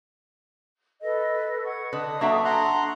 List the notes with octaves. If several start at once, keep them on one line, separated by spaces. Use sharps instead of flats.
A4 B4 D#5
F#5 C#6 G#6
D3 B4 D#5 D#6
F#3 A#3 D4 F#4 A4 E5
F#5 A#5 C6 C#6